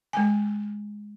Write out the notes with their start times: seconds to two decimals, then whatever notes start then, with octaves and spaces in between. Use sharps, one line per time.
0.13 G#3 G#5